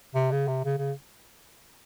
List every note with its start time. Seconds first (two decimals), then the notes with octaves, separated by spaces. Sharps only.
0.15 C3
0.32 C#3
0.48 C3
0.65 C#3
0.78 C#3